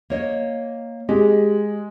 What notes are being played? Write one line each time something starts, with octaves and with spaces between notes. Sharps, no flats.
A#3 C#5 D#5
G#3 G4